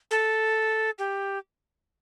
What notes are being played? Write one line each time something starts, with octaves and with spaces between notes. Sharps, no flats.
A4
G4